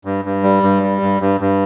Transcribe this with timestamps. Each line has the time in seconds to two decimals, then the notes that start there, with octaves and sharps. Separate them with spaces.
0.05 G2
0.25 G2
0.43 G3
0.63 G2
0.83 G3
1.02 G2
1.21 G2
1.41 G2